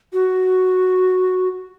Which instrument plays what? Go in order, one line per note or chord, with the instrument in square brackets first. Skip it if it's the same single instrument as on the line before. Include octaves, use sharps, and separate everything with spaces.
[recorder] F#4